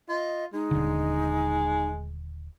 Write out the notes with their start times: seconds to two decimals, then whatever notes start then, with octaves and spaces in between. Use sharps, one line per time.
0.09 F4 D#5
0.53 G#3 D#4
0.71 D#1 D3